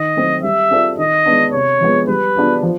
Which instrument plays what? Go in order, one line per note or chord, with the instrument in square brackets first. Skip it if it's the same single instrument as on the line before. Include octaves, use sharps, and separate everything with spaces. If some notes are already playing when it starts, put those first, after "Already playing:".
Already playing: [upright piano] D#3 [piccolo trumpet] D#5
[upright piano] F#3 A3 C4
[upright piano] G3 [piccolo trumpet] E5
[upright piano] C4 F4 A4 D5
[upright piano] D#3 [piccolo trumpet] D#5
[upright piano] G#3 B3 D4
[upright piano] C3 [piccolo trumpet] C#5
[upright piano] F3 G#3 B3
[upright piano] G3 [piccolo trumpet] B4
[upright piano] B3 D4 F4 G#4
F3